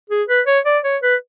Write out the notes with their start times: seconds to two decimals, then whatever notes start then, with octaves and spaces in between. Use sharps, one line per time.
0.10 G#4
0.28 B4
0.47 C#5
0.65 D5
0.84 C#5
1.03 B4